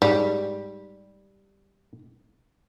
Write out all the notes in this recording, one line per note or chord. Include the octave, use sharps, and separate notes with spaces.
G#2 G3